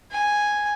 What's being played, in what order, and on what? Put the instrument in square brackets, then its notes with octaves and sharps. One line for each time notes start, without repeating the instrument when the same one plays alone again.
[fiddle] G#5